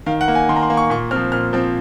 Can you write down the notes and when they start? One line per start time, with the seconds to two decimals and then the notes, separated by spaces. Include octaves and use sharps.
0.06 D#3 F5
0.21 F#5
0.28 A#3
0.35 G#5
0.49 D#3 C6
0.56 A#5
0.63 C6
0.70 A#3
0.77 C#6
0.90 A#2 C#6
1.11 C4 F6
1.16 F3
1.32 A#2 F6
1.53 F3 C4